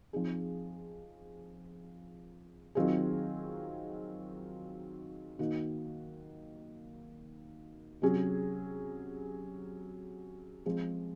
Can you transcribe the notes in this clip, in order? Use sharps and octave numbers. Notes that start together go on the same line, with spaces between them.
F3 C4 D#4 G#4
D#3 F#3 C4 F4 G#4
D#3 A#3 D#4 F#4
C3 F#3 C#4 G#4
F3 G#3 C4 F4 G#4